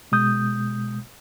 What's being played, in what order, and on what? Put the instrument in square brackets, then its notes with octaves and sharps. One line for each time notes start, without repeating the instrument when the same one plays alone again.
[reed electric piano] B2 G#3 D#6 G6